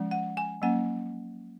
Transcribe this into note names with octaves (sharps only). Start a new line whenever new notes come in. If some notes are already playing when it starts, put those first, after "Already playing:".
Already playing: F3 G#3 C#4
F#5
G#5
F#3 A#3 C#4 F#5